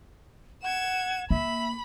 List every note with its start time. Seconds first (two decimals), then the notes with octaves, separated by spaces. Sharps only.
0.63 F#5 G#6 E7
1.31 A#3 E5 B5